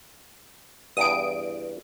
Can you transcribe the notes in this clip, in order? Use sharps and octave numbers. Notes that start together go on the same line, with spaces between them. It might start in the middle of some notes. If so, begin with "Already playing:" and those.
E2 G2 D#6 D7